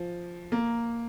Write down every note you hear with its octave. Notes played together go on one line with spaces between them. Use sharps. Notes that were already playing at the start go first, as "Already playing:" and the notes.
Already playing: F3
A#3